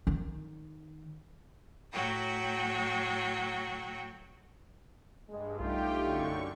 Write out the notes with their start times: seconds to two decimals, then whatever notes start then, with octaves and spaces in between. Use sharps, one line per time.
0.07 D#3 D#4
1.92 A2 F#3 F#4 G5
5.29 G2 G#3
5.60 B1 A3 C#4 D#4 F4 G4 G5
5.97 F#2 D3 C#6